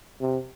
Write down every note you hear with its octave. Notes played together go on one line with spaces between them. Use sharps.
C3